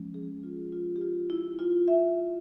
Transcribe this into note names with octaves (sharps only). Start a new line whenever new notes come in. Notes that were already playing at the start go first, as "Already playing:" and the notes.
Already playing: F3 G#3 C#4
G#4
F4
F4
G4
F4
E4
F4
E5